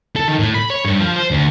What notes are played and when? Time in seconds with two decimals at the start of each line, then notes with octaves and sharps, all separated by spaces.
0.16 A4
0.28 D#3
0.39 A2
0.55 B5
0.70 C#5
0.85 G2
1.00 F3
1.16 C5
1.31 D2